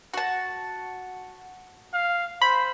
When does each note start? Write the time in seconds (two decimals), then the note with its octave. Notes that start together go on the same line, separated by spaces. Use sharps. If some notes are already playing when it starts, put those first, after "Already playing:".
0.14 F#4 A5
1.93 F5
2.42 C5 B5